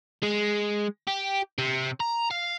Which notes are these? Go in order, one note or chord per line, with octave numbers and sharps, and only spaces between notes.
G#3
G4
C3
A#5
F5